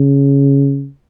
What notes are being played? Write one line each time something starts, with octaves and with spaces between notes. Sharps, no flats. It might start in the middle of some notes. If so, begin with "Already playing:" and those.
Already playing: C#3